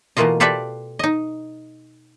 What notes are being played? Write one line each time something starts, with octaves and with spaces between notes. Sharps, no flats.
B2 E3 A3 A#3 F4 D#5
F4 G4 A4 B4 D5 E5
D#4 D#5